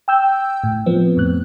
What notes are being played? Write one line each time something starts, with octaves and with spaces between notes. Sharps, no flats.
G5 E6 G6
A2
F3 B3 C4
F2 A2 F#6